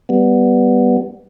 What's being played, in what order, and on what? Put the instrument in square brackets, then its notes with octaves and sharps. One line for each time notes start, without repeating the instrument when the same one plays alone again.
[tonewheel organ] G3 B3